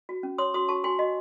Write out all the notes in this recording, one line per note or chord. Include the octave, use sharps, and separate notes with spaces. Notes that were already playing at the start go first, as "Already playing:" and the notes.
F#4
C#4
C#5 C6 D#6
F#4 C6 D#6
F#4 A5 C#6
F#4 G#5 C6
F#4 D#5